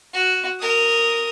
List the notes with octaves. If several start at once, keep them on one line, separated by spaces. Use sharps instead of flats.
F#4
A#4 D#6